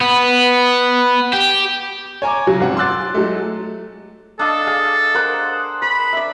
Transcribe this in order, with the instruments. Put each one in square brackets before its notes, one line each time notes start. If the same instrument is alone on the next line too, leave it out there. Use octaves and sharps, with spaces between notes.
[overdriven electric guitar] B3
G4
[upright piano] C#5 G#5 A#5 D6
C#3 F#3
G#1 C4 F#5
C6 D6 E6 F#6 A6
F#3 G#3 A3
[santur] D4 D#5 F5 [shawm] A4
[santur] G#4 F5
A#4 C5 F#5
[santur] C5 [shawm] B5
[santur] D5 E5